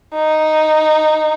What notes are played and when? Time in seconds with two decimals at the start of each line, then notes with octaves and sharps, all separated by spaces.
0.15 D#4